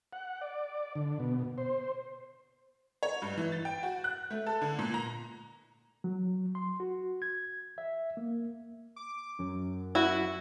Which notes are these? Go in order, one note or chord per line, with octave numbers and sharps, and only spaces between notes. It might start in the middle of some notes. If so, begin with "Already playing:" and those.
F#5
D5
D3
B2
C5
C#5
G2
E3
A6
G5
F#4
F#6
A3
A4
D3
A#2
A#5
F#3
C6
F#4
G#6
E5
A#3
D6
F#2
E4 F#4